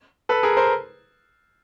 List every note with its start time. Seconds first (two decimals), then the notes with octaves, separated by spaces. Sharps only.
0.29 A4 B4
0.43 G#4 A#4
0.57 A#4 C5